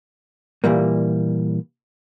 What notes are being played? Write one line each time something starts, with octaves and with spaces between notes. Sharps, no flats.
A#2 E3 G3 A#3